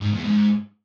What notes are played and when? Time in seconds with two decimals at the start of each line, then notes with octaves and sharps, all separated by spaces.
0.02 G#2
0.13 E2
0.24 G#2